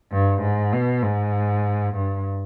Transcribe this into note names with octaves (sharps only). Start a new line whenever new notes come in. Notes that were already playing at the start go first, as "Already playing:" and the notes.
G2
G#2
B2
G#2
G2